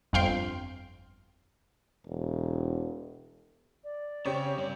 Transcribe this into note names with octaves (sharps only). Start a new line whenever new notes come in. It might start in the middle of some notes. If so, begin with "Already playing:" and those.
G1 F2 F5 G5 C6
E1
D5
C#3 C4 G4 C#5
G2 D5